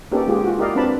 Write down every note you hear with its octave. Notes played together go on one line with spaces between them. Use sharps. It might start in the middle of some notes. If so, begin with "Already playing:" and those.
A#3 B3 C#4 D#4 G4 A4
G#3 F4 G4 G#4
F4 F#4
E4 G4 A#4 D5 D#5 F5
C4 D4 B4 A5 B5